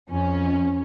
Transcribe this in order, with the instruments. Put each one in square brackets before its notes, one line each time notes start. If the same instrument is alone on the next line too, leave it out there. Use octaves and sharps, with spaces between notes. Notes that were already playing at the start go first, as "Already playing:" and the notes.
[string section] F2 C#4